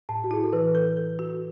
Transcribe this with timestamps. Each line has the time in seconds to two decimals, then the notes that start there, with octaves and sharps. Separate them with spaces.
0.09 A2 A5
0.24 F#4
0.31 E4 G#4
0.44 A4
0.53 E3 B4
0.75 A4
0.97 A4
1.19 F#4